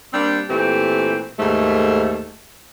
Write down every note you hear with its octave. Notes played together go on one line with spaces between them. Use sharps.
G3 A#3 C4 D4
A#2 E3 A3 C4 G4
D#2 G#2 A3